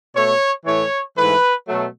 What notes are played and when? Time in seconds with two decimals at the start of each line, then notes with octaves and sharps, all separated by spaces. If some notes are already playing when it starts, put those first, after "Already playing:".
0.14 B2 A3 C#5
0.65 A2 E3 A3 C#5
1.16 G#2 E3 A3 B4
1.67 B2 F#3 A3